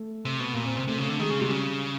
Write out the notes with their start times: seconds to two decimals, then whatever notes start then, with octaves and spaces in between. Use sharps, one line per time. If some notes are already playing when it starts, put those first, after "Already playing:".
Already playing: A3
0.25 C3
0.40 B2
0.54 A#2 A#3
0.65 C4
0.76 C3 C4
0.87 C3 A3
0.98 C#3 A3
1.09 D3
1.19 D#3 G#3
1.30 C#3
1.40 C3 G3
1.50 C#3